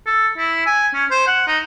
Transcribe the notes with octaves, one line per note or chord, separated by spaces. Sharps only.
A4
E4
G#5
C#4
C5
F#5
D#4